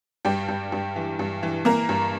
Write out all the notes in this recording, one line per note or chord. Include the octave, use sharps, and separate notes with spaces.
G2 G3 G4
G2
G2
E3
G2
E3
E3 A#3 A#4
G2